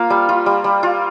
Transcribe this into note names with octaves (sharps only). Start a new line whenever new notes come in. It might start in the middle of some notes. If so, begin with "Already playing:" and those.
Already playing: A#3 F4 F5
G3
F4
G3
G3
F4